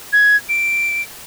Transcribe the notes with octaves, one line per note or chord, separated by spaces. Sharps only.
G#6
D7